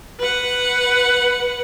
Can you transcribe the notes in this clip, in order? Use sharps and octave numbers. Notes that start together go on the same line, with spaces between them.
B4 F#5